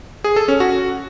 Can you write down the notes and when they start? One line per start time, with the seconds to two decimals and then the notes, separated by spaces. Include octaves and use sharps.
0.24 G#4
0.36 A4
0.48 C#4
0.60 F#4